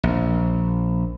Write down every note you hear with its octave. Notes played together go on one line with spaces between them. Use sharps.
A#1